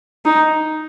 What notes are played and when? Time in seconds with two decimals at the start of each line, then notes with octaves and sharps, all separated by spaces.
0.25 D#4